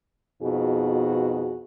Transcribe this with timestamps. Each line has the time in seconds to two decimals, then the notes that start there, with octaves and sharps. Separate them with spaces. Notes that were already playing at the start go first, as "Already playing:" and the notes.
0.43 F2 B2 D#4 F#4 G#4